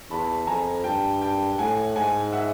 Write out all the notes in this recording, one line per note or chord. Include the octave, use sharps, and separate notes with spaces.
E2 A5 B5
F2 G#5 A#5
G2 G5 A5
G5 A5
A2 F#5 G#5
G#2 F#5 G#5
E5 F#5